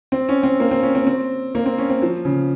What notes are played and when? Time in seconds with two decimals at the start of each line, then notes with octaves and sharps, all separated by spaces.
0.12 C4
0.29 C#4
0.43 C4
0.60 A#3
0.71 C4
0.83 C#4
0.95 C4
1.07 C4
1.55 A#3
1.66 C4
1.78 C#4
1.89 C4
2.02 F3
2.25 C#3